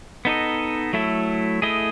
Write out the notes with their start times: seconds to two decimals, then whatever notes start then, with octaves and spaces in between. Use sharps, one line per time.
0.25 B3 D#4 A4 D#5
0.93 F#3 A3 E4 A4
1.62 A3 E4 G#4 D#5